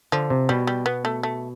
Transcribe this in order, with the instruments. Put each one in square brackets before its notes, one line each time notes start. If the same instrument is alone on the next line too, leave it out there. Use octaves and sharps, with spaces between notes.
[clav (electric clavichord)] D3 [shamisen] F3
[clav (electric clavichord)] C3
[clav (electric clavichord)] B2 [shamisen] G3
[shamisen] G3
B3
A3
A3